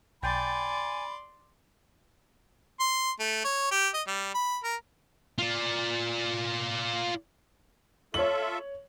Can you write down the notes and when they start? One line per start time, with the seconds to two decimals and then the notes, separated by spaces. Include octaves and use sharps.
0.22 B1 D5 G5 G#5 B5 C6 A6
2.80 C6
3.20 A3
3.44 C#5
3.71 G4
3.94 D#5
4.07 G3
4.34 B5
4.63 A#4
5.39 F4 D5
8.14 F4 A4 C#5 E5 F#7